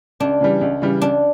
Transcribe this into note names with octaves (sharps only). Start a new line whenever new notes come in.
C#2 D4
C#3 E3 G3
C#2
C#3 E3 G3
C#2 D4